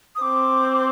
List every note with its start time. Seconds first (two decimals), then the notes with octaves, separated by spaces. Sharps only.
0.15 D#6
0.22 C4 D6